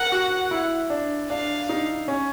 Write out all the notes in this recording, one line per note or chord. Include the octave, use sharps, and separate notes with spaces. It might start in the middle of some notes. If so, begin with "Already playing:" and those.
Already playing: A#4 F#5
F#4
E4
D4
D4 F5
D#4
C#4